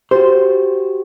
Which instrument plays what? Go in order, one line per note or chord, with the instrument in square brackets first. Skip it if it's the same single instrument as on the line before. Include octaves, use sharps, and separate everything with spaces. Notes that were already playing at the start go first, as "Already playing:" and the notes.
[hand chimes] F#4 G4 [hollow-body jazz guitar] C5